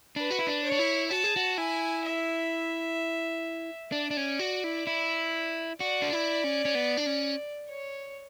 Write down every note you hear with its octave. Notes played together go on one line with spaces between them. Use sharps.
D4 B4
F#4
E4
D4
C#5
D4
E4
F#4 A5
G#4
F#4
E4 G#5
E5
D4 D5
D4
C#4
F#4
E4
E4
F#4 D5
D4
E4
C#4
C#4
B3
D4
C#4
C#5